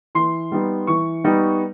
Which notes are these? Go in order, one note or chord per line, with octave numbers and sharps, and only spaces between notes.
E3 C6
G3 B3 D#4
E3 C#6
G3 B3 D#4